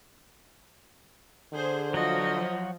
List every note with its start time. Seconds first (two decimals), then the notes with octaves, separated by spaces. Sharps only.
1.53 D3 G#4 C5
1.94 F3 F#3 F#4 D#5